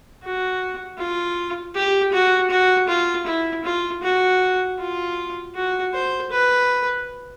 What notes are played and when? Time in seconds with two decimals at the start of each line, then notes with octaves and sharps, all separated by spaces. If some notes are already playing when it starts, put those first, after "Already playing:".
0.23 F#4
0.98 F4
1.75 G4
2.13 F#4
2.50 F#4
2.88 F4
3.26 E4
3.64 F4
4.03 F#4
4.79 F4
5.55 F#4
5.94 C5
6.31 B4